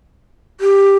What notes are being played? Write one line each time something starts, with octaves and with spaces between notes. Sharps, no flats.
G4